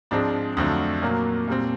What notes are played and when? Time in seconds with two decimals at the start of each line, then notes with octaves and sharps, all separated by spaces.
0.11 G#2 F3 G#3 C4 D4
0.57 F2 D3 F#3 A3 C4
1.02 A#2 F#3 A#3
1.47 A#2 G3 C4